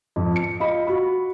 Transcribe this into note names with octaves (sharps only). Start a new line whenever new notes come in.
F2
C#7
F4 D#5 B5
F#4 B5